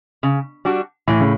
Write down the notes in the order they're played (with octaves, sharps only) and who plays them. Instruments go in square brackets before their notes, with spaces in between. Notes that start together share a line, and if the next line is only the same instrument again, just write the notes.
[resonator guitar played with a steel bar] C#3
G3 D4 F#4
[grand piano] A2 [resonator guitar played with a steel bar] E3
[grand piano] C#3